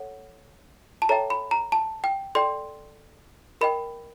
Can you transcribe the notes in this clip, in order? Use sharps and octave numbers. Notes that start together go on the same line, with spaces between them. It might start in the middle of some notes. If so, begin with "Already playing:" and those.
Already playing: A4 C#5 F#5
A5
A4 C#5 E5 G5 A#5
B5
A#5
A5
G5
A4 D5 G5 C6
A#4 D#5 G5 B5